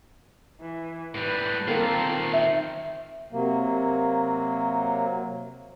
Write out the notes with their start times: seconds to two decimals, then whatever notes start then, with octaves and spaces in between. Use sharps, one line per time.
0.60 E3
1.15 A2 G3 B4
1.68 D#3 A#3 C4 F4 A4
2.01 C4 A5 A#5
2.34 E5
3.32 C3 F#3 A#3